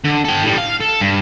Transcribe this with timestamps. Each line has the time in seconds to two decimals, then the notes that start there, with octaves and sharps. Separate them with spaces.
0.04 D3
0.25 A4 G5
0.44 A2 G3
0.58 F5
0.80 A4
1.01 G2